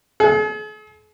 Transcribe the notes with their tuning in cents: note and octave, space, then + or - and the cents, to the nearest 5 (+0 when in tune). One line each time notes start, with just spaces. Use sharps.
G#4 +45